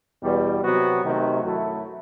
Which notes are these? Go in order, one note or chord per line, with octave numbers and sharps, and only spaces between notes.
E2 B2 G3
C3 F#3 B3 F#4
C3 D#3 F#3 A3
F#2 F#3 A3 E4